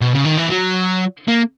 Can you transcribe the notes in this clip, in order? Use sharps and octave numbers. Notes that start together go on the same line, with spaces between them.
B2
C#3
D#3
E3
F#3
A#3